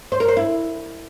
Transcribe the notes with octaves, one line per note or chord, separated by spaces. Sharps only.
C5
A#4
C5
E4